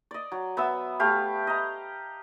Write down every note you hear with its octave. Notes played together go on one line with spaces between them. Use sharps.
D5 D#5
F#3
B3 E5 E6
A3 G4 F5
D#5 A#5